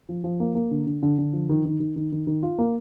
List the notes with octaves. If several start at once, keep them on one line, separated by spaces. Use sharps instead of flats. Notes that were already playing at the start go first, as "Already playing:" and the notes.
F3
F3
A#3
A#3
D3
D3
D3
D3
F3
D#3
D#3
D#3
D#3
D#3
D#3
F4
A#3